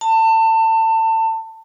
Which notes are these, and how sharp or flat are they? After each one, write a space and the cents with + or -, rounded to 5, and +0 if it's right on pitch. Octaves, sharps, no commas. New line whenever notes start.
A5 +30